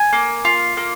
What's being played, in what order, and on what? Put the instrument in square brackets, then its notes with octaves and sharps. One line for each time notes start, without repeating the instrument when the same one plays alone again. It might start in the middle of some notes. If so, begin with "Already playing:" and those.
Already playing: [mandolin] G#5
A#3
F4
A#3